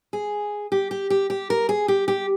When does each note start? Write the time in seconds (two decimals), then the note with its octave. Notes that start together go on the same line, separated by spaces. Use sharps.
0.13 G#4
0.72 G4
0.91 G4
1.10 G4
1.30 G4
1.50 A#4
1.69 G#4
1.88 G4
2.08 G4